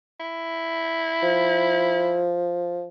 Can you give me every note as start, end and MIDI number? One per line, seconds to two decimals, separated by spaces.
0.20 2.27 64
1.23 2.88 53